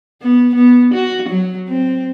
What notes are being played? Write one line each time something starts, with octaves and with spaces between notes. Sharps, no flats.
B3
B3
F#4
F#3
C4